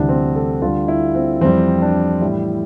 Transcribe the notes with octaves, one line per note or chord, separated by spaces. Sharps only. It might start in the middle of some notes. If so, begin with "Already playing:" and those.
Already playing: D2 C3 E3 G3 D4
C4
A4
D2 D3 G3 F4
E4
C4
F2 E3 G3 C4
D4
A2 E3 G3 E4